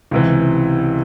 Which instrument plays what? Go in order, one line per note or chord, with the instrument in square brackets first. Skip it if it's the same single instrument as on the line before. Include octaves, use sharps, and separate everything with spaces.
[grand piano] C#2 C3 E3